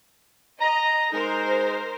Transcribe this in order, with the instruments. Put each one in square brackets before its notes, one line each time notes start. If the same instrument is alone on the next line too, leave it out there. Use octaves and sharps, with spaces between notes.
[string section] D#5 [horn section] A#5
[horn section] G#3 D#4 [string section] A#4 C5